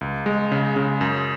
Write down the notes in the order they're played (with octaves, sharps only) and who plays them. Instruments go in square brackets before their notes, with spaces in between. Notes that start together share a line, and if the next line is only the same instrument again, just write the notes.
[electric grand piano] C#2
G#3
C#3
C#3
F#2